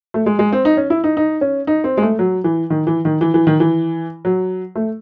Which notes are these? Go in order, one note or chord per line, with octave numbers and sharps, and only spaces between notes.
A3
G#3
G#3
C4
D#4
C#4
E4
D#4
D#4
C#4
D#4
C4
G#3
A3
F#3
E3
D#3
E3
D#3
E3
E3
D#3
E3
F#3
A3